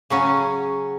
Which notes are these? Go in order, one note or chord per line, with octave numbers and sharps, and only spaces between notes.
C#3 F#3 C#4